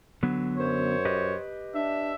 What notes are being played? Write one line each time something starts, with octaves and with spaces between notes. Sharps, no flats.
D3 F#3 B3
F#2 C5 C#5
G4 B4 D#5
D4 E5